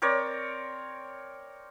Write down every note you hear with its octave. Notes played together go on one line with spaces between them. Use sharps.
C4 A#4 C#5 D5